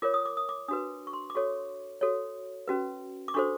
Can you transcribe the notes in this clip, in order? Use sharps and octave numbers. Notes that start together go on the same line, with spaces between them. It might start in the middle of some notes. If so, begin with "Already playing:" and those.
F4 A#4 C#5 D6
D#6
D6
D#6
D6
D4 F#4 B4 D#6
C#6
C6
D6
F#4 A4 C#5 C#6
F#4 A4 C#5
C#4 F#4 B4
D6
D4 F#4 A4 C5 C#6